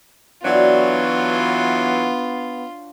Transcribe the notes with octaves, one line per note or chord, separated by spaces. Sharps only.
E3 F#3 B3 D4 F4 F#4 C#5